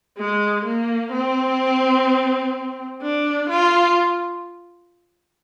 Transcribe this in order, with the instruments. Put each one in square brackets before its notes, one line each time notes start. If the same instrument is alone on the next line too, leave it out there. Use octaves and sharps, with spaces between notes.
[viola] G#3
A#3
C4
D4
F4